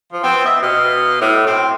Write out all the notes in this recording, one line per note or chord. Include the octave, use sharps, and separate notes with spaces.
F3
B3 C4
D#5 E5
B2 D#5 F5
A2
C4